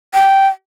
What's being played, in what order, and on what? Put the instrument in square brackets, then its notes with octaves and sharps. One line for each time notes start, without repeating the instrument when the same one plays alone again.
[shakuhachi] G5